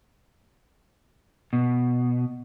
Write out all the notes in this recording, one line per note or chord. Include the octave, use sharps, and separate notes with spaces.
B2